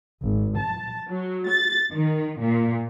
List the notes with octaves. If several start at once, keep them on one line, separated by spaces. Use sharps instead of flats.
G#1
A5
F#3
A6
D#3
A#2